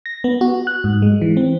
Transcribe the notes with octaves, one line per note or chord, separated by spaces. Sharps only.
A#6
B3
F#4
F#6
G#2
G#3
E3
C4